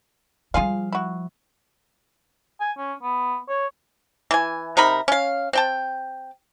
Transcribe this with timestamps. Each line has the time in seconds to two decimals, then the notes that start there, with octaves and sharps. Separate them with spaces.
0.54 F3 G3 F4 G#4 F5
0.93 E4 F#4
2.60 G#5
2.78 C#4
3.03 B3
3.49 C#5
4.31 E3 G#5
4.77 C3 D#4 A#4 B5
5.08 C#4 F5
5.53 C4 G5 A5